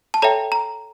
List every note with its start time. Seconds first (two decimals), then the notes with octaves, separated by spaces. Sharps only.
0.14 A5
0.22 A4 C#5 E5 G5 A#5
0.52 A#5